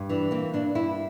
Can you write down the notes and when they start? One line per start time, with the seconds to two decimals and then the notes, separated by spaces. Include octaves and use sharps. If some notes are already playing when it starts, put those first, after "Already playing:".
Already playing: G2
0.09 E3 D4
0.31 A#3 C4
0.54 G2 D4
0.75 G2 E4